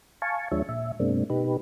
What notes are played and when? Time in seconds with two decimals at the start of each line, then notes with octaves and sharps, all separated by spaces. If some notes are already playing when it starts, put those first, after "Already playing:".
0.22 F5 G#5 A5 C#6
0.51 D#2 F3 G#3 D4 C#5 E5
0.69 A#2 E5
1.00 F#2 B2 G#3 A#3 C4 D4
1.30 B2 D#4 G4 B4